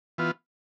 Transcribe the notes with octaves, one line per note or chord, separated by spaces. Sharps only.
E3 B3 F4